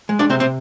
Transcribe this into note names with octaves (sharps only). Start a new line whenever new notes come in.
G#3
D4 D5
C3 C4 C5
C4 C5